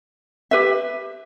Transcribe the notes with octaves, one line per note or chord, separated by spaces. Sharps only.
G4 B4 E5